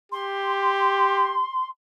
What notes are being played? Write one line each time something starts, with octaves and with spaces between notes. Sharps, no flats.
G4 C6